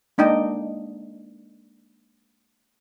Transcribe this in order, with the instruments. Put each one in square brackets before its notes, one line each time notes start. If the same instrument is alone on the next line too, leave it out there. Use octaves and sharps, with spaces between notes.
[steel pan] G#3 A#3 D4 D#4 D#5 G5